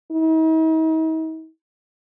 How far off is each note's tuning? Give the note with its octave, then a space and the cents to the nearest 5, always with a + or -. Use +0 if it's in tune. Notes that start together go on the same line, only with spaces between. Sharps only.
D#4 +45